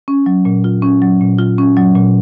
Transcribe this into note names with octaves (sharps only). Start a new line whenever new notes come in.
C#4
F#3
A#2
F4
C#4
F#3
A#2
F4
C#4
F#3
A#2